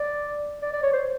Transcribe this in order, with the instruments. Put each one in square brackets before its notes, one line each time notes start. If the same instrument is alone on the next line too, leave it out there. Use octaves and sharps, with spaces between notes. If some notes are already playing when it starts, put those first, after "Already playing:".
Already playing: [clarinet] D5
D5
D5
C#5
C5